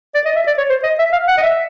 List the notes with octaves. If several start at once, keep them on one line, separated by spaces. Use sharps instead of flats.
D5
D#5
E5
D5
C#5
C5
D#5
E5
F5
F#5
D#5
E5